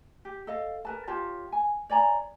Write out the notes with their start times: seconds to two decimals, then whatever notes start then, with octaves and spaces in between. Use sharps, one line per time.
0.25 G4
0.47 A4 D#5 F5
0.85 A#4 B4 A5
1.08 F4 G4 C#5 A5
1.52 G#5
1.90 C#5 D5 G#5 A#5